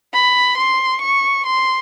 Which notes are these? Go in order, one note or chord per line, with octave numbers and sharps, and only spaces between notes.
B5
C6
C#6
C6